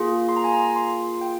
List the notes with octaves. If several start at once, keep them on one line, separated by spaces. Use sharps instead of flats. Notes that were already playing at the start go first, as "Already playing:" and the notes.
Already playing: A#3 F4 G#4
C6
A#5
G#5
A#5
C6
G5